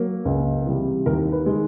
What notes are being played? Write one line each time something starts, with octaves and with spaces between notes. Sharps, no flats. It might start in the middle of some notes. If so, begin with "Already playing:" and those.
Already playing: F#3 A#3
C#2
C3 E3 G3
D#2 A#4
B4
D#3 G#3